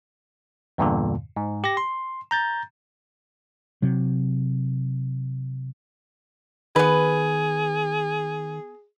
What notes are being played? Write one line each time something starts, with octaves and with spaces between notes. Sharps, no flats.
E2 G2 A#2 D3
G#2
G4 A#6
C6
A#5 G6 A6
C3 F#3
D#3 B3 G#4 B4